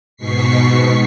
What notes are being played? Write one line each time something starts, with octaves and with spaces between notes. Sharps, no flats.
G#2 B2 C#6 B6 C7